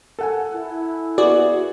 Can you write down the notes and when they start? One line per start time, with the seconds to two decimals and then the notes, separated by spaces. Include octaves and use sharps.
0.19 A4 F#5 G#5
0.54 E4
1.18 B3 F#4 G#4 D5